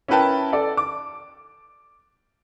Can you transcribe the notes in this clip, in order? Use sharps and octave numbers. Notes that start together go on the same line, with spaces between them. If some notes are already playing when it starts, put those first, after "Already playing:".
C#4 E4 A#4 B4 G5 A5
A4 D5
D6